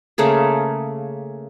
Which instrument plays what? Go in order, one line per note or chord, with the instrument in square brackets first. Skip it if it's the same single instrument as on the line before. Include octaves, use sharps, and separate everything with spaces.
[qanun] C#3 A3 A#3 G#4